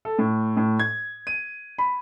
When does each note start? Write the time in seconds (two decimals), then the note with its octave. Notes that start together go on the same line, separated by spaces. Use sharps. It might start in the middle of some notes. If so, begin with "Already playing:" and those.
0.05 A4
0.18 A2
0.57 A2
0.79 G#6
1.27 D#7
1.78 B5